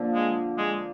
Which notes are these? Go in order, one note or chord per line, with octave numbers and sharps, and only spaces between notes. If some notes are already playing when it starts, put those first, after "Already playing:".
Already playing: D3 F3 A#3
G#3
G#3